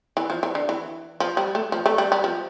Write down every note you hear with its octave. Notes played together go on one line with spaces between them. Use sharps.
E3
F3
E3
D3
E3
F3
G3
A3
F3
A3
G3
G3
F3